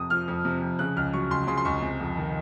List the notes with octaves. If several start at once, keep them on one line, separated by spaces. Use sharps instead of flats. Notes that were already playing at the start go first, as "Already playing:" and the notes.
Already playing: F2 C3 D#6
F3 F6
F2
C3
F2
C#3 F#6
C#2 F6
F#3 C#6
C#2 C6
C#3 C6
C6
C#2 C#6
C3
F2
D#3